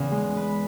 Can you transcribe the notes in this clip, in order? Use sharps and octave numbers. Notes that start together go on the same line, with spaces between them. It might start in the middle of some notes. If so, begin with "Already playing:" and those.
Already playing: E2 C#3
G#3
B4